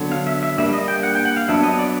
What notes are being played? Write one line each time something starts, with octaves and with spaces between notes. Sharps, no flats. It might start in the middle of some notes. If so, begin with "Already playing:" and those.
Already playing: D3 F#3 B3
F5
E5
E5
G3 A#3 D4 E5
D#5
G5
F#5
G5
F#5
F5
F#3 B3 D4 E5
D#5
D5